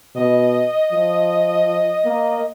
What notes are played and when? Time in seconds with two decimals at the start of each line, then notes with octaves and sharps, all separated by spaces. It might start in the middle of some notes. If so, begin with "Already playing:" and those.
0.15 B2 D#5
0.92 F3
2.05 A#3